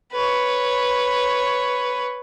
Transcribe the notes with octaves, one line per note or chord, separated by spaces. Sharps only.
B4 C#5